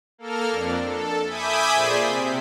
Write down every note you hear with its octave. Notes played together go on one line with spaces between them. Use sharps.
A#3 A4 A#4 F6
F2 D4
A4
E5 G#5 B5 D6 D#6 G6
A#2 G#4 C5 D5 C6 B6
C3